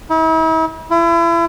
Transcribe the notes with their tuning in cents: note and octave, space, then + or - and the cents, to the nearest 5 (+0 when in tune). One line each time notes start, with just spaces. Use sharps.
E4 -45
E4 +35